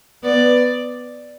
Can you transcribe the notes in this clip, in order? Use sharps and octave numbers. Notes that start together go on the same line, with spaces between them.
B3 D5